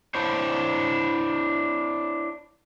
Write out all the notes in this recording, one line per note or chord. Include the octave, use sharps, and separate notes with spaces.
D4 E4 C5 C#5